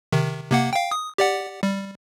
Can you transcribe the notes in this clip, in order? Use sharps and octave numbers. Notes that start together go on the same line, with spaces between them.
C3 D#3
C3 A#3 F#5
F5 G5
D#6
G4 D5 F#5
G3